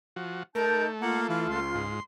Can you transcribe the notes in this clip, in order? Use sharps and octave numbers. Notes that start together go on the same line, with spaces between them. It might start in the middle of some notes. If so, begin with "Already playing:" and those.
F3 F#4
A3 D#4 A#4 A5 G6
A#3 F4 F#5
E3 F5
C#2 C6
G#2